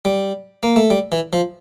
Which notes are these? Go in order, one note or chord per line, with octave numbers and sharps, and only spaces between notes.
G3
A#3
A3
G3
E3
F3